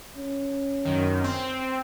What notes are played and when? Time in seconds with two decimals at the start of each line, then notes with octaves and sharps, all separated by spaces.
0.17 C#4
0.85 F#2 D#3
1.24 C4